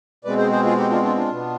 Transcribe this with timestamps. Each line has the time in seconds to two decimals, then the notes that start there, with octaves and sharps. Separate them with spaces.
0.25 B2 G#3 C4 B4 D5
0.38 G#4 C5
0.51 G#4 C5
0.64 F4 G#4
0.77 D#4 G4
0.90 D4 F4
1.03 D4 F4
1.16 D4 F4
1.29 B2 B3